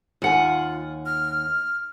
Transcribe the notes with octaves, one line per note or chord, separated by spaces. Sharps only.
D#2 F4 F#5 G#5
F6